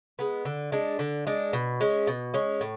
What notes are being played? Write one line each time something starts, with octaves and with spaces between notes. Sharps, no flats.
G#3 B3
D3
G#3 D4
D3
G#3 D4
B2
G#3 C#4
B2
G#3 C#4
A2